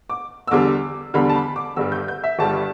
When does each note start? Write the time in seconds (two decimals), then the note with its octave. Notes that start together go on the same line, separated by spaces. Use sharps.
0.10 D6
0.47 E6
0.51 E2 D3 G3 D6
1.14 E2 D3 G3 B5
1.29 A5
1.36 B5
1.56 D6
1.76 G1 G2 G3 E6
1.92 G6
2.08 G6
2.24 E5
2.39 G1 G2 G3 A5